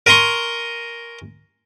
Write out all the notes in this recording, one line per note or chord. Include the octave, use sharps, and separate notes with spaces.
A#4 G#5 A#5 C6 C#6